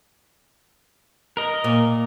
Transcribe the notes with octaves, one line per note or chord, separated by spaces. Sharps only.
A#4 D#5
A#2